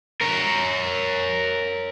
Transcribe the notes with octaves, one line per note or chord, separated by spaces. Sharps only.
A#4 C#5